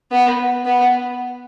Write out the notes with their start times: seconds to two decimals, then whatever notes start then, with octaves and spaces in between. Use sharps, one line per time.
0.11 B3
0.66 B3